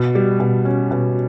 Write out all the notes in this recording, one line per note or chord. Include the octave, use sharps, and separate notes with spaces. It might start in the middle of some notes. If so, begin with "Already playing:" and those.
Already playing: B2
G3
B2
C#4
B2